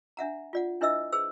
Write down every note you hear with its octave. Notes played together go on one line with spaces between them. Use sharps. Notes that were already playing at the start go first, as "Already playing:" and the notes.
D4 E5 F#5 A#5
F4 D5 F#5
D4 E4 B4 D#5 E5 E6
G#4 B4 C5 E6